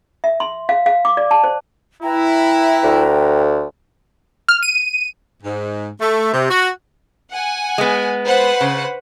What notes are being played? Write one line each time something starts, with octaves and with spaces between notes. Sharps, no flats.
E5
C6
F5
F5
D6
D5
A5
C5
E4 B4 G5 A#5
D2
F6
D#7
G#2
A3
C3
F#4
F#5 G#5
G#3 B3
B4 C5 F#5
C#3